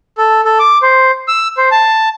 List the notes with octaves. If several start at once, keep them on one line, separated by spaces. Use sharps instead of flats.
A4
A4
D6
C5
E6
C5
A5